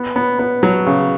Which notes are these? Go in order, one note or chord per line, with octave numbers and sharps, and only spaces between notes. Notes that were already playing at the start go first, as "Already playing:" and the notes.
Already playing: B3
B3
B3
F#3
C#3